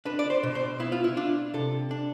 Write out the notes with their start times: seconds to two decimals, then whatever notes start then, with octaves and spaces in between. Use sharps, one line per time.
0.05 D4 B4
0.19 D5
0.30 C5
0.43 B2
0.55 C5
0.80 B3 E4
0.92 F4
1.04 E4
1.17 D4 F4
1.54 C3 A4
1.91 D4